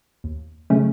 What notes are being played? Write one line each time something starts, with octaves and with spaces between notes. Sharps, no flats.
D#2
C#3 F#3 A3 C#4